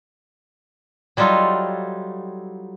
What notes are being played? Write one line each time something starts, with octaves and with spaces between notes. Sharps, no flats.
F#3 G3 D#4 F4 A4 D#5